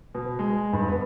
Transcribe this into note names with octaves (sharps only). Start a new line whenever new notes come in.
B2
G#3
G2
B3